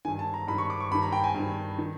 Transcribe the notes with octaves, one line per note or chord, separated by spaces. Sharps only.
G2 D#3 G#5
A5
A#5
G2 D#3 B5
C#6
D6
C#6
G2 D#3 B5
A#5
G5
G#5
G2 D#3
D#3